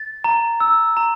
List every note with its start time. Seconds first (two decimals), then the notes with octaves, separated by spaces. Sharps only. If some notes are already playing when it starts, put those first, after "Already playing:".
Already playing: A6
0.24 A#5
0.60 E6
0.97 A#5